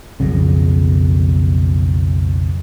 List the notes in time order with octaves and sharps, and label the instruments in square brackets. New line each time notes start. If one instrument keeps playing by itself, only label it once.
[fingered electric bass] B1 F2 C#3